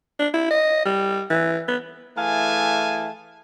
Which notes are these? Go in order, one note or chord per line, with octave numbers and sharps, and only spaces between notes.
D4
E4
D#5
G3
E3
B3
E3 A3 G#4 F5 G#5 A5